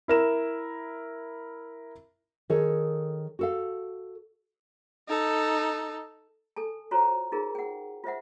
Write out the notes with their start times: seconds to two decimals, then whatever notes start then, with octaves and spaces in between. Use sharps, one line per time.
0.08 E4 A#4 E7
2.50 D#3 G#4 A4 C#5
3.39 F#4 A4 F5
5.08 D#4 A4
6.56 A4 G#5 A5
6.91 F4 F#4 C5 C#5 A5 A#5
7.32 D#4 F4 G#4 A#4
7.55 F#5 G5
8.04 F4 C5 E5 F#5